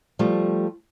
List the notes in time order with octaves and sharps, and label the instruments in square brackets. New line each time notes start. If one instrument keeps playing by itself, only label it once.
[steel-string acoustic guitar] F3 G3 A3